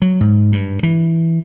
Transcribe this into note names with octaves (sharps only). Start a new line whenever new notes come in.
F#3
G#2
G2
E3